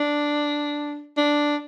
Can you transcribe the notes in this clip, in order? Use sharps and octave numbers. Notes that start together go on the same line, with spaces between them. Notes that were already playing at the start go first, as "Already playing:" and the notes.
Already playing: D4
D4